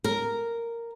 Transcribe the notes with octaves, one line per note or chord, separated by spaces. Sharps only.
A#4